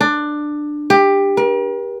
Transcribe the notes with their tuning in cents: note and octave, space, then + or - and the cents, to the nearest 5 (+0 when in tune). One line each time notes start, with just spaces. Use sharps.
D4 +15
G4 +15
A#4 +45